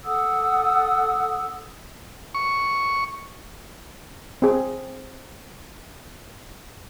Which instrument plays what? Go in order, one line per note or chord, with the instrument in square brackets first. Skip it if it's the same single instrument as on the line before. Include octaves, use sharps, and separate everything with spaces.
[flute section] A4 F#5 D#6 E6
[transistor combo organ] C#6
[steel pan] C4 G#4